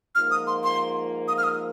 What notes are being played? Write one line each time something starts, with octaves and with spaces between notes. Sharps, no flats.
G#2 F3 A#3 F4 F6
D#6
C6
C6
D#6
F6
D#6